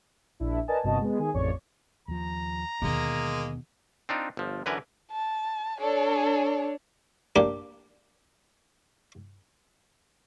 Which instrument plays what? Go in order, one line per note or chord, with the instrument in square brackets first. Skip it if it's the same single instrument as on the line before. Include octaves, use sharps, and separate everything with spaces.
[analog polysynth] A#1 D4 E4
A#4 B4 D5 D#5 G#5 A5
G1 G2 C3 F#4 D#5 A5
G#3 B3
D#3 G#4 G#5
A1 F2 C#5 D5 C#6
[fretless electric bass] D#2 F3 [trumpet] A#5
[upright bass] D#2 D3 [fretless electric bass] B2 [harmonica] G#3 A#3
[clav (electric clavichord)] C4 D4 D#4 F4
G1 F3
F#2 D3 E3 A#4 B4 G#5
[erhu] A5
[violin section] D4 C#5 [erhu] A4
[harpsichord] A#3 D4 G4